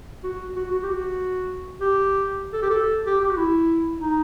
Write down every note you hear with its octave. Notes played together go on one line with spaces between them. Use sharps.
F#4
F#4
F#4
G4
F#4
G4
A4
G4
A4
G4
G4
F#4
E4
D#4